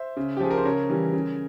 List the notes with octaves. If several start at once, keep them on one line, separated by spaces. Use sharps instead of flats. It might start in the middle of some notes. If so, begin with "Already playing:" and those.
Already playing: C5 E5
C#3
G4
F3 G#4
A#4
C5
C#3 A#4 C#5
E3 G3
C#3